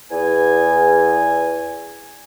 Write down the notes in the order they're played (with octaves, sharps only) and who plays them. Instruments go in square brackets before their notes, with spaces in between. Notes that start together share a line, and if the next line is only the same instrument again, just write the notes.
[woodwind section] E2 G#5